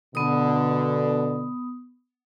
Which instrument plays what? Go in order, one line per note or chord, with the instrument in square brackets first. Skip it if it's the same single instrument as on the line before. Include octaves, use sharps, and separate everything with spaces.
[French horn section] B2 D3 [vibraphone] B3 D#6